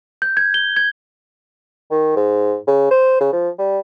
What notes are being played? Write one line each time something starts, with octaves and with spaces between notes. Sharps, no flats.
G6
G#6
G7
G#6
D#3
G#2
C#3
C5
C#3
F3
G3